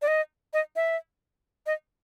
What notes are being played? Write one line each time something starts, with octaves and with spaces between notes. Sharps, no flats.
D5
D#5
D#5
E5
D#5